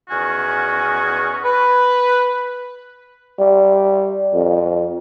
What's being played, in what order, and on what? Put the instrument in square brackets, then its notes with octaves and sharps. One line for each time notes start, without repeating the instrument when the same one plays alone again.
[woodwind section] E2 D#3 C#4 F#4 G#5
B4
[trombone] G3
F2